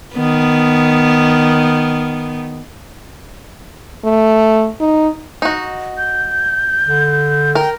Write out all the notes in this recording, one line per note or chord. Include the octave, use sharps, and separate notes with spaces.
D#3 B3
A3
D#4
D#4 F#4
G6
D3
A#4 G5